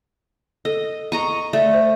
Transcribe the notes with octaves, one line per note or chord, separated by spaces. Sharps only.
A4 D#5
D#5 A#5 C#6 D#7
A3 D5
C5